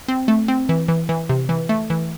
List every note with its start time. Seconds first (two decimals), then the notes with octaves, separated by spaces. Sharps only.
0.08 C4
0.28 A3
0.48 C4
0.69 E3
0.88 E3
1.09 E3
1.29 C3
1.49 E3
1.69 A3
1.90 E3